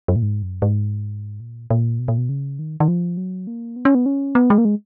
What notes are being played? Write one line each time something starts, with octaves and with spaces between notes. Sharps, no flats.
F#2
A#2
G#2
F#2
G#2
A#2
A#2
B2
A#2
B2
C#3
D#3
D#3
F3
F#3
A#3
B3
C#4
B3
C#4
B3
G#3
A#3
G#3